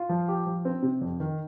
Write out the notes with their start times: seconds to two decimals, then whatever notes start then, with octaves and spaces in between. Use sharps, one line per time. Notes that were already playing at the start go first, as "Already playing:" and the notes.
Already playing: F4
0.09 F3
0.28 G4
0.46 F3
0.65 C4
0.83 C3
1.01 F2
1.20 D#3